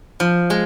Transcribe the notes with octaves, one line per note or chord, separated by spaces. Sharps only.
F3
G#3